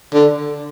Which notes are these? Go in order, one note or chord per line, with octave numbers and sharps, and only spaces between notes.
D3